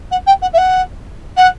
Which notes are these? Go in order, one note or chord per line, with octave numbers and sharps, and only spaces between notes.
F#5
G5
F#5
E5
F#5
F#5